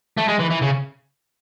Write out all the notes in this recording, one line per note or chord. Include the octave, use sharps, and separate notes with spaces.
A3
G#3
E3
E3
C#3